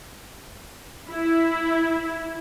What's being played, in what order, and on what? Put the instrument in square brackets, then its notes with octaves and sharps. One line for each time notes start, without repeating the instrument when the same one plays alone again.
[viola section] E4